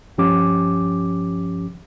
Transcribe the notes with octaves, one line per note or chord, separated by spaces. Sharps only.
G2 F3 C#4 G4 D6